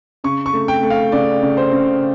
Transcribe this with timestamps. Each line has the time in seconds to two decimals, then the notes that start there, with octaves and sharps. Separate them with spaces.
0.24 C#3 C#6
0.46 C#6
0.53 A3
0.68 G5
0.83 A3
0.90 F5
1.12 C#3 D5
1.42 C#3
1.57 C5
1.72 C#3